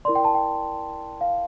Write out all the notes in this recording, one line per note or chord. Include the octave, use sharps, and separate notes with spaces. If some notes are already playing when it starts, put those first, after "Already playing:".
E4 A#4 D5 C6
G5
A5
G5
F5